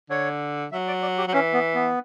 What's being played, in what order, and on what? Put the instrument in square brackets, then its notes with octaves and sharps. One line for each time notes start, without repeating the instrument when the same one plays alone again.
[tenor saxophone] D3 [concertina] C#5
[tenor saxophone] F#3 [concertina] E5
[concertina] D5
D5
G4
[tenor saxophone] F#3
[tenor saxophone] E3 [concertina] C#4
[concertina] B3
B3